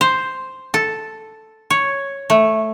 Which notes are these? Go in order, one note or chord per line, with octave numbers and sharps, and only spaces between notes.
C5
A4
C#5
A3